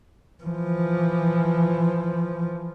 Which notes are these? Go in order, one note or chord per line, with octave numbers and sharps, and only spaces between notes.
E3 F3